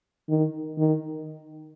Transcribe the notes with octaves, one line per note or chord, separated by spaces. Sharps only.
D#3
D#3